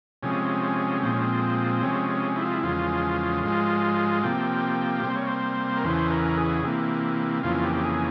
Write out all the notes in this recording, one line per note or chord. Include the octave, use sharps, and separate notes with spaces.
C3 F3 G#3 C#4
A#2 F3 G#3 C4
C#4
C4
C3 F3 G#3 C#4
C#4
E4
F4
E4
E2 C#3 F3 G#3 F4
G#2 F3 G#3 F4
C3 F3 A#3 G4
C3 G3 A#3 C5
C#5
C5
A#4
E2 C#3 E3 C5
A#4
G#4
C3 E3 A#3
F2 C#3 E3 A#3 F4
G4
G#4